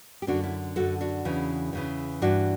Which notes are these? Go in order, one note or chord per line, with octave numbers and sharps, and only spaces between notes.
G4
F#2 D3 D4 F#4
C#4 E4
F#2 D3 F#4 A4
D4 F#4
E2 C#3 E3
E2 C#3 E3
G2 E3 D4 F#4